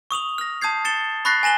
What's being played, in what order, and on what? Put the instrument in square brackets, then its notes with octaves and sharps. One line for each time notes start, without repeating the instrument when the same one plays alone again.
[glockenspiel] C#6 D#6 F7 F#7
F6 A#6
A5 D#6 G6 G#6 C7
A6 C#7 E7 G7
B5 C#6 F#6 A6 A#6 C7
G#5 A#6 E7 F#7 G7